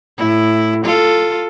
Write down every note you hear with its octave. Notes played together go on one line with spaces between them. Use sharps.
A2 E4
F4 A4